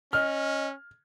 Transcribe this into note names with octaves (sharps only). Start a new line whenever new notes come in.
C#4 D#5 F6